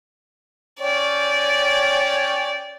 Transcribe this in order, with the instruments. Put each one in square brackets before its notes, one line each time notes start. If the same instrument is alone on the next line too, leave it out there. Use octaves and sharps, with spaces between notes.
[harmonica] C#4 C#5 G5 [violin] D5